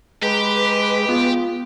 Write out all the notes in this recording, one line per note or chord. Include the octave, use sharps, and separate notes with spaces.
G#3 G4 B4 A#5
B3 F4